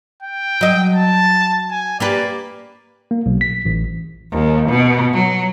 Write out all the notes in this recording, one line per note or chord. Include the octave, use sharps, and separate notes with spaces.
G5
F#3 D#5
A5
G#5
A#3 G4 B4 D5
A#3
B1
B6
A1
D#2
B2
F#3